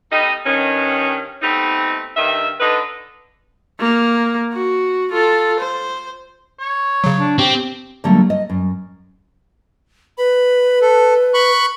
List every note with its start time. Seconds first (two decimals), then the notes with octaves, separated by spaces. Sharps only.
0.11 G3 A3 B3 D#4 A4 D#5
0.45 G2 D#3 C#4
1.42 G3 A3 B3 C4 D#4
2.17 G2 D#3 E5
2.60 D3 D#4 B4
3.80 A#3
4.53 F#4
5.12 F4 A4
5.60 C5
6.60 C#5
7.04 C#3 F#3
7.19 D4
7.38 C4 G4
8.04 D3 F#3 G3 A3 A#3
8.30 D#5
8.50 F#2
10.18 B4 B5
10.82 A4
11.34 B5 C#6 F#6